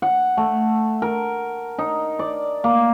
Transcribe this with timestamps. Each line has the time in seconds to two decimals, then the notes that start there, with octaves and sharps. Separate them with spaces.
0.02 F#5
0.37 A3
1.02 A#4
1.78 D#4
2.19 D5
2.64 A#3